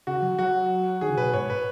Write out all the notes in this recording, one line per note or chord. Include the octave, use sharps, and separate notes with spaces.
C#3 F#4
F#3
F#3 F#4
D#3 G#4
C#3
B2 B4
G#2 C#5
B4